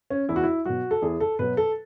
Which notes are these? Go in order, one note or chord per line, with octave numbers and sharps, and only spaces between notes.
C#4
E2 E4
F#4
E4
B2 F#3 F#4
A4
E2 G#4
A4
B2 F#3 B4
A4